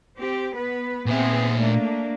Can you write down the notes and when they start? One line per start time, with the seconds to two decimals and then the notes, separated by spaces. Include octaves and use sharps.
0.16 C4 G4
0.54 B3 B4
1.06 A#2 B3 C4 G#4 E5
1.59 A3 A#3 D4